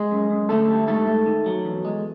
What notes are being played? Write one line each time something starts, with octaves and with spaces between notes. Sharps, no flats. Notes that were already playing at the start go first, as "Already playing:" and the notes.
Already playing: G#3 G#4
F#2
F#2
D3 A3 A4
G3
G#2 A3 A4
A3
D#3
F#3
E2
G#3